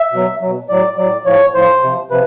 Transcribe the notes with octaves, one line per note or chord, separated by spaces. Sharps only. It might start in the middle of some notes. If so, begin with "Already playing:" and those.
Already playing: E5
B2 F#3
B2 F#3
A2 F#3 D5
A2 F#3 D5
A2 F3 C#5
A2 F3 C5
C3 F3
C3 F3 B4